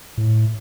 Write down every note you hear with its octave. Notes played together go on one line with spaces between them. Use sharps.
A2